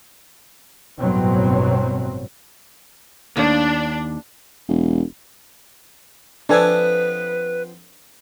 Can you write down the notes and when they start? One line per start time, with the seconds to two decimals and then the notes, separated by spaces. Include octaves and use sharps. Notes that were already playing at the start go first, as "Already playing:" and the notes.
0.99 A1 G2 B2 F#3 C4
3.37 D#2 D4
4.69 E1
6.49 F3 B3 C4 D4 A4 B4 G#5